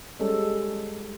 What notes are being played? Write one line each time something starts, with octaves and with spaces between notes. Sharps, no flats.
G3 G#3 C#4 A4